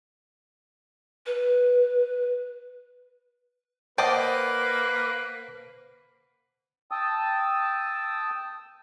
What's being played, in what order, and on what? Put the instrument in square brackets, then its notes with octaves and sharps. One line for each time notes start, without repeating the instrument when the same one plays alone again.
[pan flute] B4
[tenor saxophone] A#3 [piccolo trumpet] B4 [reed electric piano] C5 F#5 A5 [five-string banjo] D5 D#5 G5
[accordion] G5 A5 D#6 E6